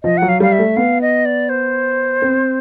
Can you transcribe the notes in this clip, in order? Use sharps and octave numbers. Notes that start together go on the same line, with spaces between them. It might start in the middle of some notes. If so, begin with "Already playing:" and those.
F3 D#5
F#3 F#5
F5
G3 F5
E5
A3
B3 F5
D#5
D5
C5
C4